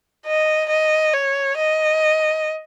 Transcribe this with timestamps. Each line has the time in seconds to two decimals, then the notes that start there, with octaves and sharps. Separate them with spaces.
0.26 D#5
0.69 D#5
1.13 C#5
1.57 D#5